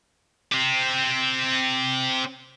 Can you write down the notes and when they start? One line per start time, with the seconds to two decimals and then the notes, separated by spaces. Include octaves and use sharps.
0.52 C4 G4